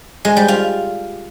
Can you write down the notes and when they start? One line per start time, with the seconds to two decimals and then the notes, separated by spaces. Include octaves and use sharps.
0.25 G#3
0.37 G3
0.48 F4